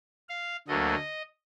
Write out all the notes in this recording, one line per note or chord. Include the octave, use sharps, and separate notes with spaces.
F5
D2 D3 F#3 A#3 D#5